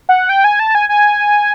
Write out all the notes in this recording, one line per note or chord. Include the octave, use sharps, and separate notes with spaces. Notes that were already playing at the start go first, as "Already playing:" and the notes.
F#5
G5
G#5
A5
G#5
G#5